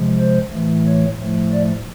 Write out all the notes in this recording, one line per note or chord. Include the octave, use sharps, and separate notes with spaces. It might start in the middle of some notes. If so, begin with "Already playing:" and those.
Already playing: C3 F3 G#3
C5
A2 E3 A3
C#5
A2 F3 A3
D5